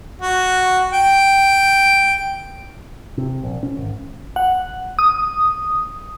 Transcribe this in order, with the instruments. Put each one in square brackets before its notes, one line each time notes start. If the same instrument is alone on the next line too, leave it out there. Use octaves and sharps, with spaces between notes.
[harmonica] F#4
G5
[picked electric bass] C3
A#1
C#4
G#1
[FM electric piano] F#5
D#6